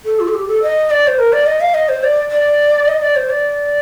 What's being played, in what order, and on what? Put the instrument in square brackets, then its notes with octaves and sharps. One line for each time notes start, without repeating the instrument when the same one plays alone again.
[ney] A4
F4
A4
G4
A4
D#5
D5
C5
A#4
D5
D#5
F5
D#5
C5
D5
D5
D#5
D5
C5
D5